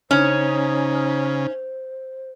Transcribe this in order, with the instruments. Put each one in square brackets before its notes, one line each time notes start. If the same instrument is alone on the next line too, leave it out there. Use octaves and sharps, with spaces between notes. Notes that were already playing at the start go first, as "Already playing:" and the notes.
[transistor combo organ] C#3 [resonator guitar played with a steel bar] C#4 [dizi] D#4 [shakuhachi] C5